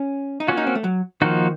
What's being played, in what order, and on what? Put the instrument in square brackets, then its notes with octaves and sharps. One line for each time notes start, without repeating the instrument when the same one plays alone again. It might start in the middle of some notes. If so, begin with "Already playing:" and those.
Already playing: [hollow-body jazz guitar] C#4
D#4
[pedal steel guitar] A#3 C#4 F#4 [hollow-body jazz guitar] F4
[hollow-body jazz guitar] D#4
C4
A3
F#3
[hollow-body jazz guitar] D#3 [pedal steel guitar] F3 A#3 D#4 F#4